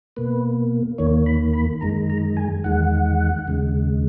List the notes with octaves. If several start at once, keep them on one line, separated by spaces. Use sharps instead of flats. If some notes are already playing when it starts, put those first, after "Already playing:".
B2 A#3 B4
D#2 D#3 A#3 C#5
B5
B5
F#2 D#3 G#3 A#5
A#5
G#5
E2 D#3 G#3 F#5
D#2 C#3 G#3